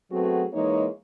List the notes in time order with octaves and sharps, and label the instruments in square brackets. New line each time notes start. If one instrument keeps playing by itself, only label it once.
[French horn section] F#3 A3 B3 C4 F#4 G#4
E3 G#3 A#3 D#4 C#5